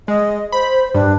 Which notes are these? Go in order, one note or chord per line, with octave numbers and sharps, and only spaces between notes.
G#3 D#5
C5 B5
G2 D4